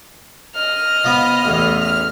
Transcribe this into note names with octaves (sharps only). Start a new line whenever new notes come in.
D#5 F6
F3 B3
A1 E2
F6